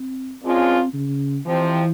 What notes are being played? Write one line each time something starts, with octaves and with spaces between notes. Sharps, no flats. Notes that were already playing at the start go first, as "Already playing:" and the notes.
Already playing: C4
A#2 F3 G#3 C4 C#4 F4
C#3
F2 C3 E3 F3 C4